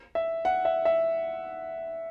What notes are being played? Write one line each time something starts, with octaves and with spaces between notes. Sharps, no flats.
E5
F#5
E5
E5